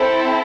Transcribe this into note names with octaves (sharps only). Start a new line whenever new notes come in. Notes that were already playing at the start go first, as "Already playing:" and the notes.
Already playing: C4 E4 A4